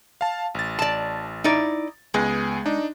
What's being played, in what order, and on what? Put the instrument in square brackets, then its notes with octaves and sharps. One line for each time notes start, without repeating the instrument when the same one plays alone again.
[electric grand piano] F5 A5
A1 A6
[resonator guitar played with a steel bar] D5 A5
D#4 E4 D5
[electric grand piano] C#2 B3 G#4 [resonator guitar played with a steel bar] G#3
[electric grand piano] D4 D#4